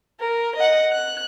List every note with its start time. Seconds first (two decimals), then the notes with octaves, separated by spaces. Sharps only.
0.20 A#4
0.56 D#5 F#5
0.91 F#6